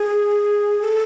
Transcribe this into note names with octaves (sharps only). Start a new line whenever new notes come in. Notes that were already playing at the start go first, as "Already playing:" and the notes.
Already playing: G#4
A4